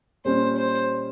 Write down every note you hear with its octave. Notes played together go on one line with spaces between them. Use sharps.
A#2 G3 C#4 C5
C5